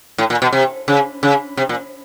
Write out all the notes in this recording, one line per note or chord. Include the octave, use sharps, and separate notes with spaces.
A2
A#2
B2
C3
C#3
C#3
C3
A#2